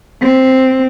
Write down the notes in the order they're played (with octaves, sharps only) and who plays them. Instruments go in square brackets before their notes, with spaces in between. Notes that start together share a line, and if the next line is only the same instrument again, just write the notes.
[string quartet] C4